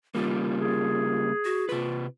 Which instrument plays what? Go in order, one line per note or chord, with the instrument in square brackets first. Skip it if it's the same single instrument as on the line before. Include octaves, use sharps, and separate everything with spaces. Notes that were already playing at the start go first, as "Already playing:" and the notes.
[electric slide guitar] C#3 G3 A#3 [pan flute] F4
[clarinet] G#4
[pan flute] F#4
[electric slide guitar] C3 B4 [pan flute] F4